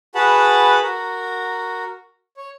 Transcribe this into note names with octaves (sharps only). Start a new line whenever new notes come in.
F#4 G#4 B4 F#5 A5 B5
F#4 A#4
C#5